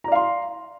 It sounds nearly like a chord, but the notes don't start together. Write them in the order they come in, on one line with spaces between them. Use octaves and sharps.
A#5 D5 F5 C6